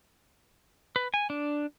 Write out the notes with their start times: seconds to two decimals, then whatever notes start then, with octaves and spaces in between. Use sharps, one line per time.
0.96 B4
1.14 G#5
1.30 D4